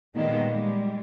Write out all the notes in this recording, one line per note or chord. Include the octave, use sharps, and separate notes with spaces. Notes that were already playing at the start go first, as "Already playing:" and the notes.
A#2 D#3 G3 G#3 A#3 B3
G3 G#3